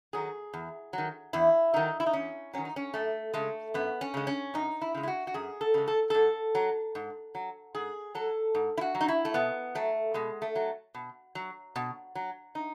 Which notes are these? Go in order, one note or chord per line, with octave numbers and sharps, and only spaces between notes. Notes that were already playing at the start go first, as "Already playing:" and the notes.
D#3 F#3 G#4
E2
D#3 F#3
E2 E4
D#3 F#3 D#4
E4
D#4
E2 C#4
D#3 F#3 C#4
D#4
C#4
F#2 A3
C#3 G#3 A3
F#2 B3
C#4
C#3 G#3
C#4
F#2 D#4
E4
C#3 G#3
E4
F#4
F#4
F#2 G#4
A4
C#3 G#3
A4
G#2 A4
F#3
G#2
F#3
G#2 G#4
F#3 A4
G#2
E4
F#4
F#3
D#4
E4
A3
B2 B3
F#3 A3
B2 G#3
A3
F#3
B2
F#3
B2
F#3
D#4